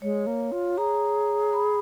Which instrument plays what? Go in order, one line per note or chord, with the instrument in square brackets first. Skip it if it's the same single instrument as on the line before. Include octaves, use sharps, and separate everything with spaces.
[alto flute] G#3 [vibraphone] C#5
[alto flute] A#3
F4
[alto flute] G#4 [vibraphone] A#5
[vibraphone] B5